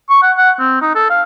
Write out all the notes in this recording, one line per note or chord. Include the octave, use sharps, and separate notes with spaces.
C#6
F#5
F#5
C4
D#4
A4
F5